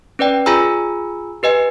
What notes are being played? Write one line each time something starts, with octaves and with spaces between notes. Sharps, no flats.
C#4 B4 D5 G5
F4 G#4 G#5 A#5 B5 E6
G4 B4 D#5 G#5